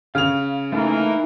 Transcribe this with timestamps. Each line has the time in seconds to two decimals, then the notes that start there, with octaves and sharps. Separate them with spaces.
0.15 C#3 F5 F6 F7
0.72 E3 A3 A#3 D#4 E4 A#4 F5